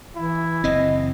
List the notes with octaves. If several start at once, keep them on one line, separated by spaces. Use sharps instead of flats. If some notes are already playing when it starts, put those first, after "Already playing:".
E3 E4
F#1 E3 C4 D#5